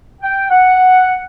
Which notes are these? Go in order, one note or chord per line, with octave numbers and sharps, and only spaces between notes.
G5
F#5